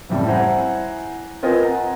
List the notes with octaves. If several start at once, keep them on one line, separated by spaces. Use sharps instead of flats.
F#1 F2 A2 G3 A5
E4 C5 F#5 G#5 A#5
C4 F4 A#4 B4 D#5 G#5
F#5 A#5